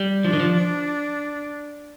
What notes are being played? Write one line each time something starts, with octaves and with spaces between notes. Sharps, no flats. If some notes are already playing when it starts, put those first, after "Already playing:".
Already playing: G3
F3 D4
D#3
F3
D4